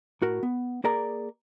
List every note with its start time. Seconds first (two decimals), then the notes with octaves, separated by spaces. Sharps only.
0.22 A2 F#4 A#4
0.43 B3
0.84 A#3 G#4 A#4 D5 A#5